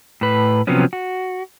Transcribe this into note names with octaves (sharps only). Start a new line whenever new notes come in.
A2 B4
C3 F3 F#3 B3 C#4
F#4